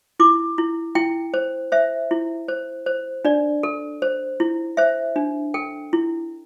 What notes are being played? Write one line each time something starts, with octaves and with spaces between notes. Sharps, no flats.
E4 D6
E4
E4 G5
C5
C5 E5
E4
C5
C5
D4 D5
A4
C5
E4
C5 E5
D4
A4 G5
E4